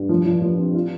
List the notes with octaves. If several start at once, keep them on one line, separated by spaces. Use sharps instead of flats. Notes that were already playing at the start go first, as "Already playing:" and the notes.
Already playing: G2
F3
F3
F3
C4
F4